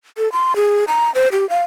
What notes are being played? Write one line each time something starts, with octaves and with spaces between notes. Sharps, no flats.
A4
C6
G#4
A#5
C5
G4
F5